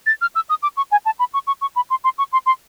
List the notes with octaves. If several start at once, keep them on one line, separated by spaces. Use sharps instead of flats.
A6
F6
E6
D#6
D6
C#6
G#5
A5
B5
C#6
C#6
C#6
B5
C6
C6
C#6
C6
C6